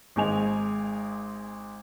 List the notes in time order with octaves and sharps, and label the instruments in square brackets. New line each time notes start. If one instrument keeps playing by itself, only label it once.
[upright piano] G#1 G#3 G#5 F7